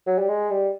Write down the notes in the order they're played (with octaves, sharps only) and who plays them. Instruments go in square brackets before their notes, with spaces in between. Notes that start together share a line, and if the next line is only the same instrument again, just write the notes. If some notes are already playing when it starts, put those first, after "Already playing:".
[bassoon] F#3
G3
G#3
G3